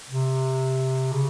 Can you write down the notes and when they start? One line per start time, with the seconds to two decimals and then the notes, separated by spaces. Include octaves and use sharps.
0.09 C3
1.12 C#3